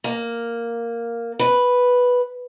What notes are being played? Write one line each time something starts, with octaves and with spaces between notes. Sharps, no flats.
A#3
B4